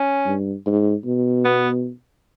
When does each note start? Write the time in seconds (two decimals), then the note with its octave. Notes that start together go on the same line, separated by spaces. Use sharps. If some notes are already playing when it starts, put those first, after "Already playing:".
Already playing: C#4
0.26 G2
0.66 G#2
1.05 B2
1.45 B3